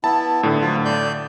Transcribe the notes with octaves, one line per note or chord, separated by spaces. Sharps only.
B3 E4 A5
A2 D3
F3 F#3 F4
D5 G6